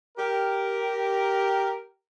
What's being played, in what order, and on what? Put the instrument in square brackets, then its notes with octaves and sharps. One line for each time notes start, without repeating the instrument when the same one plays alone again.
[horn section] G4 A#4